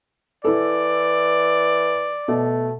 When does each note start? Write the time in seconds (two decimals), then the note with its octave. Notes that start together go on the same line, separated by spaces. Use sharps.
0.45 E3 E4 A4 D5
2.28 B2 A3